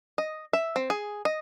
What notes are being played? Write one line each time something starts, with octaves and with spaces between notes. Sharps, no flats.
D#5
E5
C4
G#4
D#5